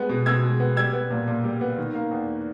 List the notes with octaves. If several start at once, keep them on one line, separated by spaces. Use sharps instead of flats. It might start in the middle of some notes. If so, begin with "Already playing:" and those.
Already playing: G3 G#3 B3
B2
B2 E6 G#6
G#3
B3
G3 E6 G#6
B3
A#2
A#2
G3
B3
D#3
A#3
E2